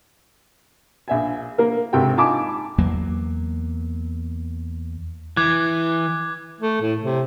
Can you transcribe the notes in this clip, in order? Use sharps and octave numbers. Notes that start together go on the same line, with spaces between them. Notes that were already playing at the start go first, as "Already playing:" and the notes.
A#1 E5 G#5
A#3 A#4
G#1 C3 C4 F#4 A4 G5
D#4 F4 G#5 A5 B5 D6
E2 F#3 A#3
E3 D6 F#6 G#6
A3
A2
C3